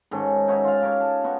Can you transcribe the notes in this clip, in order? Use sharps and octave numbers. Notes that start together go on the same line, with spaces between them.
G#2 D#3 C#4 A4
D#4 F#4 C#5 E5
F4 F5
G4 A#4 C#5
A5
B3 D#4 F#4